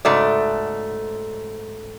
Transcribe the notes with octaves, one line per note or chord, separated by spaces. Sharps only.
G#2 C#3 A3 F#4 D5